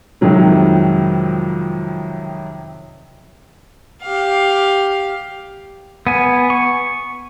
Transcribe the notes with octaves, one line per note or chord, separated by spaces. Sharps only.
F2 C3 D#3 F#3 G#3
G4 F5
B3 G#5
C#6